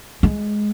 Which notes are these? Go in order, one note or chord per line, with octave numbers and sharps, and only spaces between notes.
G#3